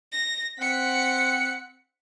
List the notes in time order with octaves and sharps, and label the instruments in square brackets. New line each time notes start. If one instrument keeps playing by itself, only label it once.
[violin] A#6
[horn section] C4 F#5 [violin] B6 C#7